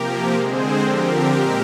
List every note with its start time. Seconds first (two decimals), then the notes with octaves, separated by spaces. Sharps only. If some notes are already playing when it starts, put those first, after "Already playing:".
Already playing: C3 F3 A#3 G4 A#4
0.34 D3 G#3 C4 G#4 C5
0.81 D3 F3 C4 G4 A#4
1.29 A#2 G#3 C4